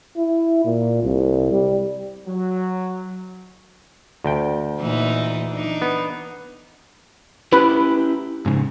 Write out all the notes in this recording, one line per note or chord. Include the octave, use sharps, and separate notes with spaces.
E4
A#2
C2
G3
F#3
D2 G5
A#2 E3 D#4
D4 D#4
B3
C#4 E4 G4 B4
G#2 C#3